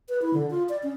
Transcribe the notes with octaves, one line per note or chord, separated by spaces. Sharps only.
B4
E4
D3
F4
D5
C#4